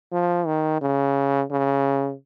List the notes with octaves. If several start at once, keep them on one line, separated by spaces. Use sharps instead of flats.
F3
D#3
C#3
C#3